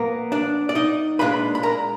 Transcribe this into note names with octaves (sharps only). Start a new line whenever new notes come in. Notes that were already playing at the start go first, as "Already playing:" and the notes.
Already playing: A#2 F3 A#3 B3 A#4
D4 D5
D5
D#4 D#5
A#2 G#3 D4 F4 B4 B5
B5
A#4 A#5